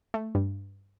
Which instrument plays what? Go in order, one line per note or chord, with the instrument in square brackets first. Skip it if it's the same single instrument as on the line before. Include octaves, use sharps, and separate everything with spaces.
[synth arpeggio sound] A3
G2